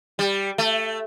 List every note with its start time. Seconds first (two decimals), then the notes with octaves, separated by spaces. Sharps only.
0.19 G3
0.58 A3